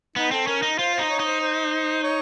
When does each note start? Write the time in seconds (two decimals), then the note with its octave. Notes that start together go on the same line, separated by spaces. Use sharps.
0.16 B3 D#4
0.31 C4 A4
0.47 C#4 A#4
0.62 D#4
0.79 F4 C5
0.94 D#4 C5
1.10 C#5
1.20 D#4
1.25 C5
1.41 C5
2.03 C#5